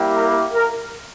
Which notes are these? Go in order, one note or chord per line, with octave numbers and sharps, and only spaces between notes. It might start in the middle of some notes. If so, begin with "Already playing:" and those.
Already playing: G3 A#3 E4 G4
A#4
A#4